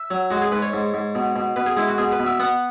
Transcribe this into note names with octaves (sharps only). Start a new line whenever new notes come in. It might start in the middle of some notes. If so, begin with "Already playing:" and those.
Already playing: E5
F#3
G#3 F#4
G#4
G#2 B4
C#5
G#2
G#2
B2
B2
B2 B4
G#4
G#3 E4
F#4
B2 G#4
B4
B2
E5
B3 F#5